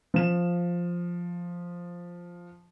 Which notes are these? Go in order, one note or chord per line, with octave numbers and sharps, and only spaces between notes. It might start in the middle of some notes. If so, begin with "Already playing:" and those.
F3 E7